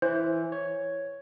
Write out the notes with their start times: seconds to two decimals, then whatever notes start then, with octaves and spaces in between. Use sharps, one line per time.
0.02 E3 C5
0.52 C#5